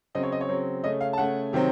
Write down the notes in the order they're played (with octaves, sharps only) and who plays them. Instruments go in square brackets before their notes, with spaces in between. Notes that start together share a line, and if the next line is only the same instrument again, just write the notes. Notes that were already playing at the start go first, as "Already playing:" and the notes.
[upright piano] C#3 F#3 C4 D#5
C#5
D#5
C#5
C#3 F#3 C4
C#3 A3 C#4 D#5
F5
A5
C#3 A3 C#4 F#5
C3 D#3 F#3 C4